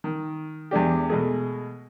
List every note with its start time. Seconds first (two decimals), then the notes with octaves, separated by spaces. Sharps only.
0.04 D#3
0.71 E2 G#3 D4 G4
1.10 B2 G#3 A3 G#4